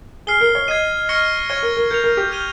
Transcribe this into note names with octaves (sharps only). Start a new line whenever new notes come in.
G#4 F6 C7 G7
A#4
C#5
D#5 G#6 C7 D#7
C#6 F6 A#6 C#7 G7
C#5 F6 G#6 D#7 G7
A#4
A#4
A#4 G6 C#7 F7
A#4
G4
F6 G#6 D#7 G7